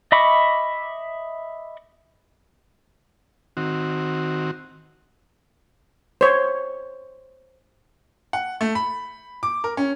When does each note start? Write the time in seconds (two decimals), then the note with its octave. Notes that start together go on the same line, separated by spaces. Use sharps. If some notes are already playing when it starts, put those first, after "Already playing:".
0.12 D#5 E5 B5 C#6 D6
3.57 D#3 C4 F#4
6.21 C5 C#5
8.33 F#5
8.61 A3
8.75 B5
9.43 D6
9.64 A#4
9.77 C#4